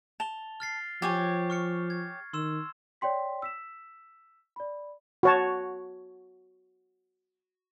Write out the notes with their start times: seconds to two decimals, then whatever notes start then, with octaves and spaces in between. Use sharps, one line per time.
0.20 A5 F7 G7
0.60 F6 A6 C7
1.02 F3 G4 C#5 G#5 A6
1.50 C#6 F6 C#7
1.90 G#6
2.33 D#3 C6 E6 E7
3.01 C#5 D5 G5 C6 B6
3.42 E6 B6 E7
4.56 D5 B5
5.23 F#4 C#5 A5